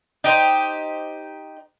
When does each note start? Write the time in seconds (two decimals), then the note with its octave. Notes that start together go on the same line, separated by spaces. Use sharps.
0.24 D#4 G4 C5